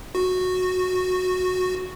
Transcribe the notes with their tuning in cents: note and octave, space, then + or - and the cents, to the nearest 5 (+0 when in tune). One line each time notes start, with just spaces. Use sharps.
F#4 -10